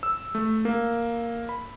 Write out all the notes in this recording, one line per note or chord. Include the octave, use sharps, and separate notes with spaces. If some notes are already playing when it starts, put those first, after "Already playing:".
E6
A3
A#3
B5